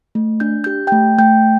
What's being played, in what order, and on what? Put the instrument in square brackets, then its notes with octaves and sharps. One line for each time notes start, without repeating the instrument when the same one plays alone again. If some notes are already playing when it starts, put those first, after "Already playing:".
[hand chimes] A3
D4 G6
G4 G6
G5 G6
A3
A3 G5 G6